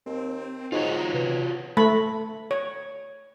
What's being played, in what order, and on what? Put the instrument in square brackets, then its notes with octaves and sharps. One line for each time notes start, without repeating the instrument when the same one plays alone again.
[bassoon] D#2 [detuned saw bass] C4
[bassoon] G#2 [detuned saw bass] D#4 [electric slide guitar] F4 F#4 C#5
[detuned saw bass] C3 [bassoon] B3
[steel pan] A3 B5
C#5